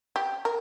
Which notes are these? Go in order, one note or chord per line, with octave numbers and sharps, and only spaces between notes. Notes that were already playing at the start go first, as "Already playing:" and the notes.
G4
A#4